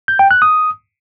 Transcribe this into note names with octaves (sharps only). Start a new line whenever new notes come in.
G6
G5
F#6
D#6